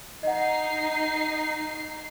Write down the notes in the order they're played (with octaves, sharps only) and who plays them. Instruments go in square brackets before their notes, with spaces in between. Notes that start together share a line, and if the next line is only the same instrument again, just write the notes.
[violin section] D#4 C7 [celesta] D#5 F#5